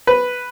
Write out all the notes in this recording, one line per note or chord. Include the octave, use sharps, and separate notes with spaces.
B4